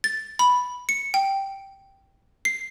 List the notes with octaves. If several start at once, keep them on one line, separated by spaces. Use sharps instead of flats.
A6
B5
C#7
G5
C7